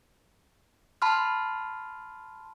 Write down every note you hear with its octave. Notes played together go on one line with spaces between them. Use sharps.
A5 B5 C6 F6